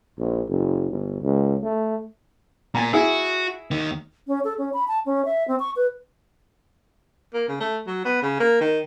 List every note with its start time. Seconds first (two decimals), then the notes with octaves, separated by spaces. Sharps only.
0.19 A#1
0.49 F#1
0.90 G1
1.21 C#2
1.63 A3
2.75 A#2 G#5 A#5
2.93 E4 F#4 G#4
3.71 D#2 D#3
4.27 C#4
4.44 A4
4.58 C#4
4.73 B5
4.88 A5
5.06 C#4
5.25 E5
5.48 C4
5.59 C#6
5.76 B4
7.34 A#3
7.48 C#3
7.60 A3
7.87 F#3
8.05 B3
8.22 C#3
8.40 A#3
8.61 D#3